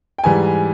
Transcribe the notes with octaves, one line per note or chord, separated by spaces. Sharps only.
G5
G#2 E3 G3 G#5